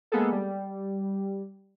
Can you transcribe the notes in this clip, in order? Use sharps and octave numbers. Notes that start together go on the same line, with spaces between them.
G#3 A#3 B3 G#4 A4
G3